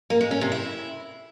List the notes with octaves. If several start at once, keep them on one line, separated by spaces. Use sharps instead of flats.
A#3
G#3
C#4
C3
E4